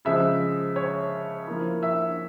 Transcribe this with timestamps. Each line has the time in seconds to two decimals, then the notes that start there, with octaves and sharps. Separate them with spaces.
0.05 C#3 F3 G#3 E5 E6
0.76 C#5 C#6
1.47 F3 A#3 E4
1.83 E5 E6